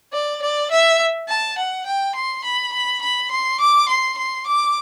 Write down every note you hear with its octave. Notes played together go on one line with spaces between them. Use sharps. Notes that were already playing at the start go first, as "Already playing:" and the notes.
D5
D5
E5
A5
F#5
G5
C6
B5
B5
B5
C6
D6
C6
C6
D6